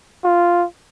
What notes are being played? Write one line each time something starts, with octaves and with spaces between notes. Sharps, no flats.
F4